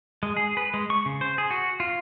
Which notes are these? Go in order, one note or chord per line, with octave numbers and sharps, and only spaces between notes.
G#3
G#4
B4
G#3
C#6
C#3
C5
G#4
F#4
F4